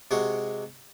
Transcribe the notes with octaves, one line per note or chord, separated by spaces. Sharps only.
C3 G#3 F#4